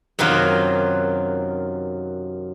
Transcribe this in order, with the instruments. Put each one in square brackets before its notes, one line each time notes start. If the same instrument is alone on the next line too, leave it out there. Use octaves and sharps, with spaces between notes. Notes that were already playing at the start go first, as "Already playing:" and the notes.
[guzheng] F#2 C3 D#3 F#3 F4 C5